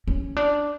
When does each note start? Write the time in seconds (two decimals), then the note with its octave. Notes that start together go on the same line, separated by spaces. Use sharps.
0.08 C#4
0.37 D4